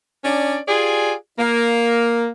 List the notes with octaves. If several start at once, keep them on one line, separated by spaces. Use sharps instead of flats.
C#4 D4 D5
F4 G4 G#4 D5 G#5
A#3